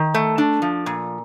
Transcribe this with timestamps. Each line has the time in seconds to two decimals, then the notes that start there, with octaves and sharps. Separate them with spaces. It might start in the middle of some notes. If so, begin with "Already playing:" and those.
Already playing: D#3
0.14 A3
0.38 D4
0.62 F3
0.86 A#2